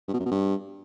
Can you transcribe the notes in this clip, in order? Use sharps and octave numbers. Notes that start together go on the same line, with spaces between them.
G2
B2
F#2
B2
G2